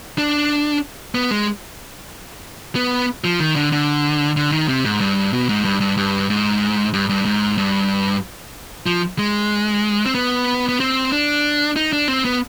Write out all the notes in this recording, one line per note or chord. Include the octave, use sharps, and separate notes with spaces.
D4
B3
G#3
B3
F3
D#3
D3
D3
D3
D#3
C3
G#2
G2
B2
G#2
G2
G2
G2
G#2
G2
G2
G#2
G2
F3
G#3
C4
B3
B3
C4
D4
D#4
D4
C4
B3